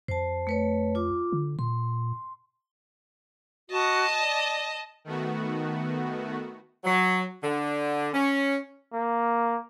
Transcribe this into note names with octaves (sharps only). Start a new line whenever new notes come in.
F2 C5 A5
A3 B4 C#5
F4 D6
D3
A#2 C6
F#4 D#5 A5
D5
D#3 A3 B3 F#4
F#3
D3
C#4
A#3